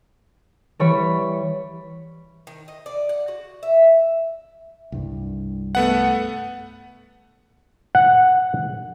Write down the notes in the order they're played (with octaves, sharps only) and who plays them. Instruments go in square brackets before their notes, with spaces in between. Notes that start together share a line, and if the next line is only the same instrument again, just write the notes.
[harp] E3 G3 C#5 B5
[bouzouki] D#3
D#5
D5
F#5
F#4
E5
[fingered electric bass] C2 G2
[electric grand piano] A3 B3 F#5
[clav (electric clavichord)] F#5